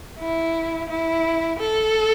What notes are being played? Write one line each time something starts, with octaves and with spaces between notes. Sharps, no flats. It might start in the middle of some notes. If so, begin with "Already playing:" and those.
E4
E4
A4